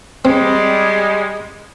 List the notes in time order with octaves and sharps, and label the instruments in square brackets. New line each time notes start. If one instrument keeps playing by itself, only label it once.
[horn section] G3 G#3 [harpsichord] C4